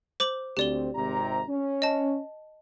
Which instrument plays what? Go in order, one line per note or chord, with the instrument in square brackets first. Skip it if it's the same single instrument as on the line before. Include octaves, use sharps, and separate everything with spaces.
[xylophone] C5 D6 F#7
[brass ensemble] D2 C4 [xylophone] G4 D5 G7
[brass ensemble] G#1 C3 A#5
C#4
[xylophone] D#5 A5